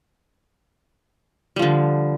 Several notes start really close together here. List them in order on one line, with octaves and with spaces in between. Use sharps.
G3 F3 D3